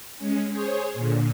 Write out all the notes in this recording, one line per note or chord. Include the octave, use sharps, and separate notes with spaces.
G#3 C#4
G#4 C5 C#5
A#2 D3